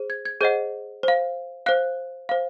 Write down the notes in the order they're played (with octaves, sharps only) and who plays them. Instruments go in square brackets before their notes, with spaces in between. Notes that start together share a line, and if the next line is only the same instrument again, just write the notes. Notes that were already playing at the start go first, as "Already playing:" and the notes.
Already playing: [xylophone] G#4 C5
G#6
G#6
G#4 C5 D#5 F#5 G6
C5 F5
C5 F5 F#6
C5 F5